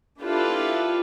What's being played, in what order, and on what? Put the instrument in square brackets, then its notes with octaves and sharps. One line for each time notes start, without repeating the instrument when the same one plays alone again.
[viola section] D4 E4 F4 G4 A4 B4